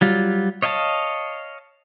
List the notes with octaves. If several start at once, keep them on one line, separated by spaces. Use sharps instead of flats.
F#3 G3 F4
C#5 D#5 F5 G5 A5